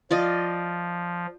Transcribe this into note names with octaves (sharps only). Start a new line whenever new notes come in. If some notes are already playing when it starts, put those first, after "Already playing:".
F3 F4 D5 D#5